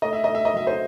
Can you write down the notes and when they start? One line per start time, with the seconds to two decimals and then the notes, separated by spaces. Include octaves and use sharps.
0.02 A3 D#5
0.13 E5
0.24 A3 D#5
0.35 E5
0.45 D#5
0.54 F#3 E5
0.67 C5 D#5